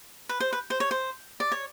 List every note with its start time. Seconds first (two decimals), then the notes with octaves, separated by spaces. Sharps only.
0.29 B4
0.40 C5
0.53 B4
0.70 C5
0.80 C#5
0.91 C5
1.40 D5
1.52 C#5